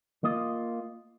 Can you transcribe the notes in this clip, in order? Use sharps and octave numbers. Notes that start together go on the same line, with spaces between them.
A#3 F4 D#5